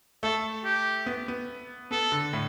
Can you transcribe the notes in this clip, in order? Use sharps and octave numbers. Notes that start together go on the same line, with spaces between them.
A3 A4
G4
B3
B3
B3 A4
D3
A2